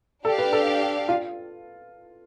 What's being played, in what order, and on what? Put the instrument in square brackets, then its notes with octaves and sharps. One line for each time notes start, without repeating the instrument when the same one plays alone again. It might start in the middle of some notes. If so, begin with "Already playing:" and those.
[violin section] D4 G4 D5 F5 [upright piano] A4
[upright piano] B4
A4
F4